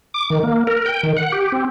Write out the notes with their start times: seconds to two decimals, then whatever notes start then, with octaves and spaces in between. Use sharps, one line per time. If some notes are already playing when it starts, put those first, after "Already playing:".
0.14 D6
0.30 D#3
0.43 A#3
0.67 A#4
0.86 G5
1.03 D#3
1.17 F#5
1.32 G4
1.52 C4